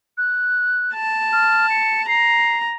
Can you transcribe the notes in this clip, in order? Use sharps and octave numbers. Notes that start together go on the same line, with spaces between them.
F#6
A5
F6
C#7
A#5 C7